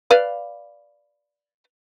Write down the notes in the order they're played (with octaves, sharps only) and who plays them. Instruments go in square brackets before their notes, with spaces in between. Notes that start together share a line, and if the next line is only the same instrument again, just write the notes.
[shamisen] B4 D5 F5